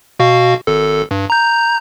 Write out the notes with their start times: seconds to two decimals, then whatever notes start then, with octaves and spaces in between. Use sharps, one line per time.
0.19 B2 F#4 F5
0.67 G#1 A4
1.11 G2
1.30 A#5 G6